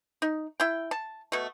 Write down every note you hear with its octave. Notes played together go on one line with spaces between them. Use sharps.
D#4
E4 G5
A5
B2 A3